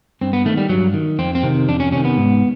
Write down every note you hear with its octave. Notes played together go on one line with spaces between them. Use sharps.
G2 C4
B3
D#3 A3
G3
G2 F#3
D#3
F2 C4
C4
C3 D#3
F2 D4
C#4
C3 D#3 C#4
B3
G#2